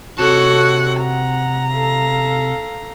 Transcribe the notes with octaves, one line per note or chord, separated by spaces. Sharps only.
C3 F#4 A4 C#5 F#5 A5
F#5 A#5
A4 F5